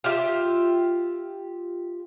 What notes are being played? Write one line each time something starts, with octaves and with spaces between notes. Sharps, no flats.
F4 G4 E5